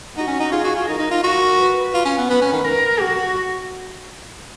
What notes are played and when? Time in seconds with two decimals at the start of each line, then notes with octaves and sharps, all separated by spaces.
0.17 D#4 F#4
0.28 C#4
0.40 D#4
0.52 F4 G#4
0.64 F#4
0.76 F4
0.88 D#4 A#4
0.99 D#4
1.11 F4
1.23 F#4 A#4
1.58 B4
1.94 F4
2.05 C#4
2.18 B3
2.29 B3 B4
2.42 C#4
2.53 D#3
2.64 A#4
3.00 F#4